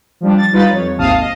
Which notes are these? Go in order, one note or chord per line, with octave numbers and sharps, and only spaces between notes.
F3 G3 D4
A6
G3 D#4 F4 B4 B5 A6
F2 C#5
G#1 D#2 C3 F5 A5 D#6
D#5